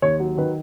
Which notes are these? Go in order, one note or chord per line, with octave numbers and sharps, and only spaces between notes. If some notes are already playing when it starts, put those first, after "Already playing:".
D#2 C#5
F#3
D#3 B4